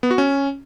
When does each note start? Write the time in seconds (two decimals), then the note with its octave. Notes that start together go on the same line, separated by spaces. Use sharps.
0.03 B3
0.11 F#4
0.18 C#4